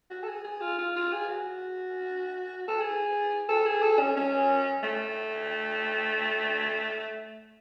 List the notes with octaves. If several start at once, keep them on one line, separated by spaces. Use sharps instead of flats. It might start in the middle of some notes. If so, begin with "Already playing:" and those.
F#4
A4
G#4
G#4
F4
F4
F4
G#4
F#4
A4
G#4
A4
G#4
A4
C#4
C#4
A3